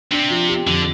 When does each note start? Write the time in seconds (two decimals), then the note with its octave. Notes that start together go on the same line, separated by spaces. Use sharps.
0.12 C3 D4
0.30 F3
0.49 G4
0.67 F2 D3